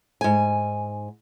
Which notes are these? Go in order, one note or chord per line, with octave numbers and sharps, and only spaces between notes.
G#2 G#5